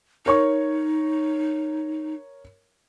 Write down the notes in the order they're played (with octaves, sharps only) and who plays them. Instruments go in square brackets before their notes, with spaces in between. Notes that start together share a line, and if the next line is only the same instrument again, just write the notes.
[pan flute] D#4 [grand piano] A#4 C#5 C#6